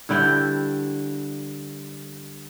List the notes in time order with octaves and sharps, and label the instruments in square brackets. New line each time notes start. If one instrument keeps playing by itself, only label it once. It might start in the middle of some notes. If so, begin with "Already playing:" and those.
[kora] G2 D3 E4 G5